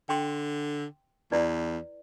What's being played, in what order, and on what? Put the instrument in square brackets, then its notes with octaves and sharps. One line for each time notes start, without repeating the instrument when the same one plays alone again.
[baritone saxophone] D3 [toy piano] G5 C6
[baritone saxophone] E2 [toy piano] E4 B4 D5